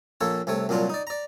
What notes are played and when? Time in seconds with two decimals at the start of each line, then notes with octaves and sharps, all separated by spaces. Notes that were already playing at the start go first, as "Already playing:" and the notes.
0.21 A#1 A#3 A4 C#5 A5
0.47 C2 C3 A3 C#5
0.69 C2 A#2 F#3 D4 F4
0.89 D#4 D5
1.07 D5 A#5